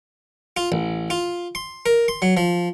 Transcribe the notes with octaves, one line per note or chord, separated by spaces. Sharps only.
F4
A1
F4
C6
A#4
C6
F#3
F3